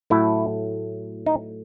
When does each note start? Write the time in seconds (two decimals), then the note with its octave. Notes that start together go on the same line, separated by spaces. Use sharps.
0.10 A2 F#3 A3 E4
1.26 D#4